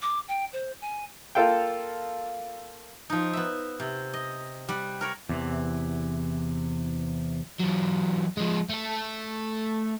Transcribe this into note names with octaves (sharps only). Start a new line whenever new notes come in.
D6
G5
C5
G#5
A#3 F4 A4 F5 G5
F3 D#4
B3 E5
C3
D#5
G3 F#5
A#4 C#5 B5
E2 C3 E3
E2 F#3
F3 G#3
A3 A4